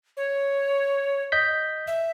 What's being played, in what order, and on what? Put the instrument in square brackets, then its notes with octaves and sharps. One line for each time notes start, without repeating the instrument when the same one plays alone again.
[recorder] C#5
[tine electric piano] D#5 G6 B6
[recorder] E5